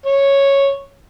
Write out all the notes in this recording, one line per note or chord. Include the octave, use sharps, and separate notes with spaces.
C#5